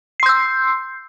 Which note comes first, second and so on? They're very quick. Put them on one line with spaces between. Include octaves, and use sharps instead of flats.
C7 C6 G6 E6